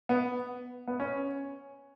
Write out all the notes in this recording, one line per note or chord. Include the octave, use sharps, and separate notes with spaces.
B3
B3
C#4